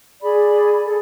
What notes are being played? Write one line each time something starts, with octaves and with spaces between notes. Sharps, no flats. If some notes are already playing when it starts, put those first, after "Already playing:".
G#4 D5 B5
G#4 A4